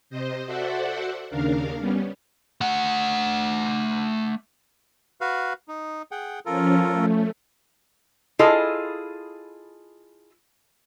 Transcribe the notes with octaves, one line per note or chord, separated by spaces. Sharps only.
C3 C5 D#5
F#4 A4 C5 D5 E5 F#5
D#2 C#3 D4 A#4 F5
G3 B3 C#4
A3 F#5
F#4 B4 F5
D#4
G#4 F#5 G5
F3 C#4 F4 A4 A#4
A3
E4 F4 G#4 A4 D#5